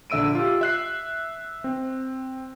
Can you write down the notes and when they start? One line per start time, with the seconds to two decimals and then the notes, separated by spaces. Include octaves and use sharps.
0.10 A#1 D3 E5 E6 D7 D#7
0.35 F4 G4
0.61 E5 F#6 C7
1.64 C4